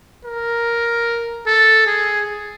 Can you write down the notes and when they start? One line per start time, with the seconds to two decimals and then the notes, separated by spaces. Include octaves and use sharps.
0.25 A#4
1.46 A4
1.87 G#4